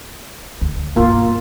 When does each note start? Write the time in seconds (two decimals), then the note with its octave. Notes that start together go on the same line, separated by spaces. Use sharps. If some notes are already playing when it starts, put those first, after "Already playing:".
0.61 D2
0.96 G2 B2 A#3 F4